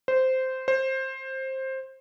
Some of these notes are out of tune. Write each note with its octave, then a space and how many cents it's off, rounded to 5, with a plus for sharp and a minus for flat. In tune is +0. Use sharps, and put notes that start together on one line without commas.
C5 -10
C5 +15